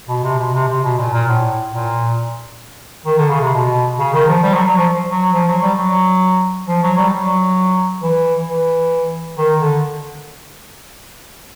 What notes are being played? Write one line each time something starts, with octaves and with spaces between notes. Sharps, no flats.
B2
C3
B2
C3
C3
B2
A#2
A#2
A2
A#2
D#3
D3
C#3
C3
B2
C#3
D#3
F3
G3
F#3
F#3
F3
F#3
F3
F#3
G3
F#3
F3
F#3
G3
F#3
E3
E3
D#3
D3